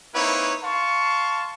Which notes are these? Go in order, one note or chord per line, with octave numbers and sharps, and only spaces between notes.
A#3 C4 D#4 E4 B4 C#5
F5 A5 C6 C#6